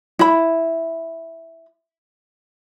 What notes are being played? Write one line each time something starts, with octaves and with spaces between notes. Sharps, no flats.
E4 B5